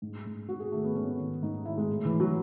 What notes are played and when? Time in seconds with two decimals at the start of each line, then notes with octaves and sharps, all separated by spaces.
0.02 G#2
0.26 G#2
0.48 G#2 F#4
0.60 G#4
0.72 D#3 A3
0.84 B3
0.95 G#2 C#4
1.19 D#3
1.42 G#2 D#4
1.65 D#3 E4
1.78 G#3
1.89 A2
2.05 E3
2.12 A2
2.20 F#3